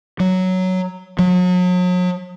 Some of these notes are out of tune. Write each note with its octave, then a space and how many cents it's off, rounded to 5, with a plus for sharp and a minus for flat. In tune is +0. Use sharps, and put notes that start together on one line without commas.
F#3 +5
F#3 -40